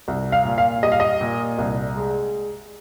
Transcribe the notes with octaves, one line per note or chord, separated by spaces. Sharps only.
C2
F5
A#2
F5
G3 D#5
F5
D#5
A#2
C2
G#3